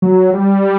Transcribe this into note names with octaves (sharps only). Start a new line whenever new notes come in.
F#3
G3